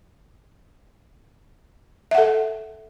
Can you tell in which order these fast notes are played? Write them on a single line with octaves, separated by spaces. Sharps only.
E5 F#5 A4